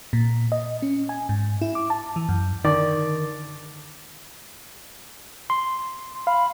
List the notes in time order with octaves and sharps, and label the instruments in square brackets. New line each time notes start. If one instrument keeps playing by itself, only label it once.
[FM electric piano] A#2
D#5
C#4
G#5
G#2
E4
D6
A5
E3
F#2
[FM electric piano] D3 [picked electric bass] D#3 [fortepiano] D5
[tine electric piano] C6
[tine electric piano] F5 [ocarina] B5